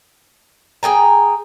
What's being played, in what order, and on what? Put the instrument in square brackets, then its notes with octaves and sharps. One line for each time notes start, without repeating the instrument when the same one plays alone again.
[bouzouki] G#4 A4 G5 A#5